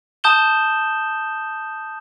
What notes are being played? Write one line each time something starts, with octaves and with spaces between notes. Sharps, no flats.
A5 D#6 G6 E7 G7